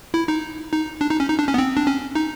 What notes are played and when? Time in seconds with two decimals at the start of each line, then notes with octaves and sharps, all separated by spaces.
0.14 E4
0.28 D#4
0.72 D#4
1.01 D4
1.10 D#4
1.20 C#4
1.29 D#4
1.39 D4
1.48 C#4
1.54 B3
1.58 C4
1.77 D4
1.87 C#4
2.15 D#4